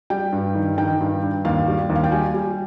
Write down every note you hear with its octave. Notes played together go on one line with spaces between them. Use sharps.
G3 G5
G2
D#3
D#3 G5
G2
G2
D#2 F5
G3
D#2
F5
G5
G3 G#5
G3